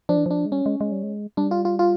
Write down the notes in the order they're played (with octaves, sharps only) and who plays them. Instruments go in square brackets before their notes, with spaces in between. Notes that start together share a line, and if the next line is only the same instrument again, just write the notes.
[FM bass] F3 [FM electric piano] D4
[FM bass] E3
[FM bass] F3 [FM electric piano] D4
[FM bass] G#3
[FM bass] G3 [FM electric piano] C#4
[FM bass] G#3
G#3
G3
G#3
[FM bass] G3 [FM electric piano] D4
[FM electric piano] F4
F4
F4